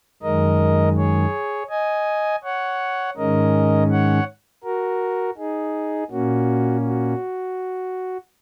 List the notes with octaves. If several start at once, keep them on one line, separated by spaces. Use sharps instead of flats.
F#2 D#3 G#3 A#4 D#5
G#4 C#5
D#5 G#5
C#5 F#5
G#2 D#3 G#3 C#4 A#4 D#5
C#5 F#5
F#4 A#4
D#4 G#4
A#2 A#3 C#4 F#4
F#4